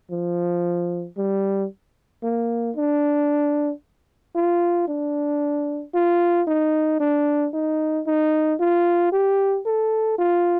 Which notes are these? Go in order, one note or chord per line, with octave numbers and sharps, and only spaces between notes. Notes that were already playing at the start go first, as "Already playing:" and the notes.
F3
G3
A#3
D4
F4
D4
F4
D#4
D4
D#4
D#4
F4
G4
A4
F4